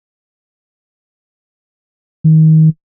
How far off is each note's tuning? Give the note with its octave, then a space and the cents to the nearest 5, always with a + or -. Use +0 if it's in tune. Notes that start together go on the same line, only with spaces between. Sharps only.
D#3 +25